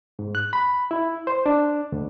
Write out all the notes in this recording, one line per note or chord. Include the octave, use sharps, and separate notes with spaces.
G#2
F#6
B5
E4
C5
D4
D2